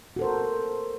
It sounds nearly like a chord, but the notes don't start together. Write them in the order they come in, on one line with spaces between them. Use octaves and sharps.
F#4 A4 C5 A#4